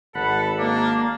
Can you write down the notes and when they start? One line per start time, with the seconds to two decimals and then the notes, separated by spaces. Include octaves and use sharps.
0.14 G#1 A4 F#5 B5
0.58 A#3 D4